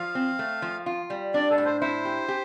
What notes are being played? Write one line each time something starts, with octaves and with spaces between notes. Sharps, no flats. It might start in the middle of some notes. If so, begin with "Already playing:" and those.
Already playing: F3 F5
C4
A3
F3
F4
G3
D4 D5
A4
A2
C5
E4 C5
G4
G4